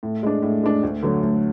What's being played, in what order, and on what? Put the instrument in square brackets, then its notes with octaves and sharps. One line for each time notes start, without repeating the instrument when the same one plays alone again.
[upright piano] A2
G#3 D4
A2
G#3 D4
D2
D3 F#3 A3
D2